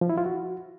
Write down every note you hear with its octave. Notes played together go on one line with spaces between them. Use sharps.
F3
E4
F4
F#4